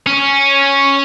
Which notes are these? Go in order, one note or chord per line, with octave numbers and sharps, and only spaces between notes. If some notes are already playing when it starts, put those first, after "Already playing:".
C#4